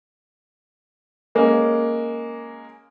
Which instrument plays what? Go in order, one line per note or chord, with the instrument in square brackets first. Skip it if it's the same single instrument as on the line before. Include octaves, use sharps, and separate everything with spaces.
[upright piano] G#3 A#3 C#4